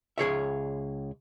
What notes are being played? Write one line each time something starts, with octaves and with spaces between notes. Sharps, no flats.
C#2 G#4 C#5 E5